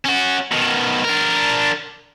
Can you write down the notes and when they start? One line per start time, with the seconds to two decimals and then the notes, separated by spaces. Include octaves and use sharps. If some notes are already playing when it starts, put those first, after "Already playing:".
0.05 C#4 F#4
0.52 B2 D#3
1.04 D4 A#4